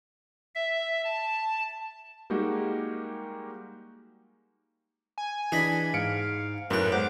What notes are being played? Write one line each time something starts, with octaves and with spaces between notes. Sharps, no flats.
E5
A5
G3 G#3 A#3 D#4 F#4 G4
G#5
E3 D4 G#4 D#5 B5
G#2 F5 C#7 D7
F#2 A2 B3 A#4 G5 F#6
G#2 C5 F#5 D6